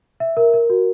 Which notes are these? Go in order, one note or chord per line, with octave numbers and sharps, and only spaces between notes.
E5
A#4
A#4
F#4